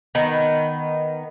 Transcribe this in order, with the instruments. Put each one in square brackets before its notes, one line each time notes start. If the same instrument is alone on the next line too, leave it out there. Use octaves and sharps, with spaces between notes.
[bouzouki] D#3 B3